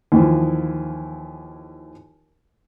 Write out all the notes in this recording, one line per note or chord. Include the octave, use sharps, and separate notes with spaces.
D#2 E3 F3